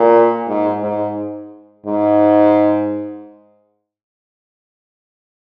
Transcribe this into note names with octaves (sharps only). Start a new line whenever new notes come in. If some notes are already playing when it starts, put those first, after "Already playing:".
Already playing: A#2
G#2
G#2
G#2